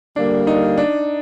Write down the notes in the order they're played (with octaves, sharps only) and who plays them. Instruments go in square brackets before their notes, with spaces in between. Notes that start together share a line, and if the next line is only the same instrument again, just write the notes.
[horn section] D3 G3 A#3 [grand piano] D4
[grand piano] D#4
D4